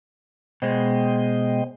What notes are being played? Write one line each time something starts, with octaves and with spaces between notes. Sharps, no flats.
B2 G#3 C5 D#5 G5